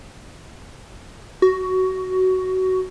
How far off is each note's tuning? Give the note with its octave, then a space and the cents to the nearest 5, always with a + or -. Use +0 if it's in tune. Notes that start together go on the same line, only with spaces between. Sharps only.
F#4 +15